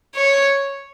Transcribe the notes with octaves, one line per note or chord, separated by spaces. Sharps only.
C#5